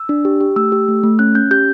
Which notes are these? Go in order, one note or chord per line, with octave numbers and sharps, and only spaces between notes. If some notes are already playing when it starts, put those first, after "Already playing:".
Already playing: E6
D4
G4
G4
A3 E6
G4
A3
A3
C#4 F#6
C#4 G6
G4 G6